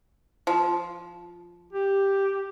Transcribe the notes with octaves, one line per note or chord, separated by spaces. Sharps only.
F3
G4